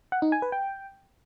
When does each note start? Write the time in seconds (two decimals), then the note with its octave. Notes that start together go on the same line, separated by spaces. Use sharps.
0.12 F#5
0.22 D#4
0.32 G#5
0.42 B4
0.52 G5